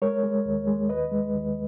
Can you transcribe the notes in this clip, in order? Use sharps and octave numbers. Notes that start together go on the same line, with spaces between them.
G#3 A#4 C#5
G#3
D#2
G#3
D#2 B4 D#5
G#3
D#2